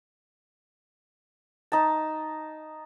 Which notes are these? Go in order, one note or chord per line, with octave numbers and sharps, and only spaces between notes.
D#4 A5